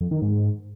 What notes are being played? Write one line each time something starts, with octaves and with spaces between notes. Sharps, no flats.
F2
D#3
G#2